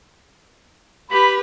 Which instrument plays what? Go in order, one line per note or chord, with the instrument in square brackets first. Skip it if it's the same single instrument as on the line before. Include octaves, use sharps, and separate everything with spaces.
[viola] G4 B4 [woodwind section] B5